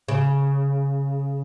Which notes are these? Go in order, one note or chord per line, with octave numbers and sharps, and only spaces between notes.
C#3